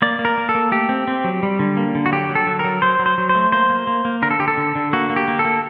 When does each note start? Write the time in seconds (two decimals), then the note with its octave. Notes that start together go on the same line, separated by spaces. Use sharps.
0.02 A#3 D5
0.19 A#3
0.25 A#4
0.38 A#3
0.49 A4
0.55 A#3
0.72 A3 G4
0.89 C4
1.07 C4
1.24 F#3
1.43 G3
1.59 D3
1.77 A#3
1.95 D3
2.06 F#4
2.12 F#3 G4
2.29 F#3
2.35 A4
2.47 F#3
2.59 F#3 A#4
2.82 F#3 C5
2.99 F#3
3.06 C5
3.18 F#3
3.29 C5
3.35 A3
3.52 A#3 C5
3.70 A#3
3.87 A#3
4.05 A#3
4.22 D3 A#4
4.31 A4
4.39 D3 G4
4.48 A4
4.57 D3
4.75 D3
4.93 A#3 F#4
5.10 A#3
5.16 G4
5.28 A#3
5.39 A4
5.45 A#3